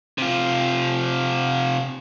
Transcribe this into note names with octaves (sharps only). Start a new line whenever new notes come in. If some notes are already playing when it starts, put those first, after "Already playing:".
C3 F4